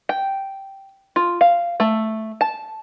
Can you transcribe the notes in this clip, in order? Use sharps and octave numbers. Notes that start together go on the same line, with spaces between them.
G5
F4
F5
A3
A5